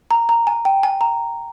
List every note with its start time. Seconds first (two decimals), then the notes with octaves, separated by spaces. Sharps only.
0.11 A#5
0.29 A#5
0.47 G#5
0.65 G5
0.83 G#5
1.01 A#5